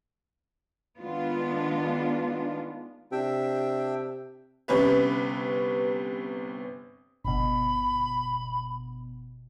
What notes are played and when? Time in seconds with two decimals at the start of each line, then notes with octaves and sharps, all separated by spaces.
0.98 D#3 G#3 B3 D4 F4
3.12 C3 D4 E5 G5
4.68 G1 C3 C#4 B4
7.25 G1 B2 B5